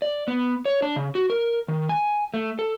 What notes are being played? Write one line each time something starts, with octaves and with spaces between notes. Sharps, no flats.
D5
B3
C#5
D4
C#3
F#4
A#4
D#3
G#5
A3
A4